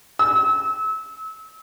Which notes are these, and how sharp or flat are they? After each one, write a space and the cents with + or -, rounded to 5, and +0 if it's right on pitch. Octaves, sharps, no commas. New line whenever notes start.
E6 -35